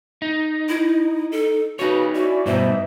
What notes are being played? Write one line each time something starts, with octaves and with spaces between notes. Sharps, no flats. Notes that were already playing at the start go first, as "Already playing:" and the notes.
D#4
E4
A4
C#3 D#4 F#4 B4 C#5
C#4 E4 F#4 D5
G2 B2 E3 D#4 C5 E5